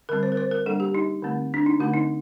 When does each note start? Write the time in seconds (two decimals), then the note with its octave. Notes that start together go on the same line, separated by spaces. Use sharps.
0.09 D3 G3 C4 A#4
0.23 C5
0.32 A#4
0.37 C5
0.51 A#4
0.66 G3 A#3 D4 A4
0.80 G4
0.95 D#4
1.22 D3 A3 C4
1.54 D4
1.66 D#4
1.80 D3 A3 C4 F#4
1.94 D#4